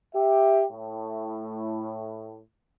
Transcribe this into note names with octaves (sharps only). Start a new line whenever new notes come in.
G4 E5
A2